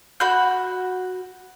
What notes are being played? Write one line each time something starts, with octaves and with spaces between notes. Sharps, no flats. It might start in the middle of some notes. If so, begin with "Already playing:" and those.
F#4 B5 G6